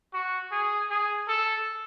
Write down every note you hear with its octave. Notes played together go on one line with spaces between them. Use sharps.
F#4
G#4
G#4
A4